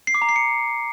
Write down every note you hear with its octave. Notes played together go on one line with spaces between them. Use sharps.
C7
D6
A#5
C7
C#7